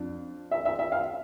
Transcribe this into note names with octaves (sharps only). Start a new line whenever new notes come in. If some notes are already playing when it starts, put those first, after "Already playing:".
Already playing: F2 D4
E5
E5
E5
F5